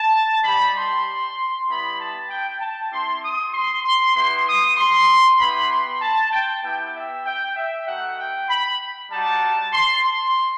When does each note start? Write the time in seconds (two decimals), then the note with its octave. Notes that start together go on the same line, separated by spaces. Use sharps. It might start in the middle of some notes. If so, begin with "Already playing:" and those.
Already playing: A5
0.43 G3 D#4 G4 B5
0.75 C6
1.68 G3 B3 E4 G4 B5
1.98 A5
2.29 G5
2.60 A5
2.91 C4 E4 G4 C6
3.22 D#6
3.53 C6
3.84 C6
4.15 B3 E4 G4 C6
4.47 D#6
4.77 C6
5.39 B3 E4 G4 B5
5.70 C6
6.02 A5
6.32 G5
6.63 B3 E4 G4 G5
6.94 E5
7.26 G5
7.57 E5
7.87 A3 D#4 F#4 F#5
8.18 G5
8.49 B5
9.11 G3 D#4 F#4 A5
9.73 C6
10.04 C6